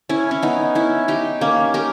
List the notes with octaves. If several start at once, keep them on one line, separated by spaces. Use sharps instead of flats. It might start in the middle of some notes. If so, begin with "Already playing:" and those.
C#4 E4
C#4
B3 D#4
C#4 E4
D#4 G4
A#3 C#4
G4 A#4